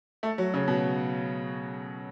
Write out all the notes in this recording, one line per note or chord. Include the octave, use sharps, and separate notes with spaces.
A3
F#3
C#3
B2